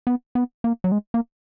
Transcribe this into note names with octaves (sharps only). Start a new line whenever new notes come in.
B3
B3
A#3
F#3
G#3
A#3